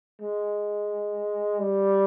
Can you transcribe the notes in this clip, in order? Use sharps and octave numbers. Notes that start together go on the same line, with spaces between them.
G#3
G3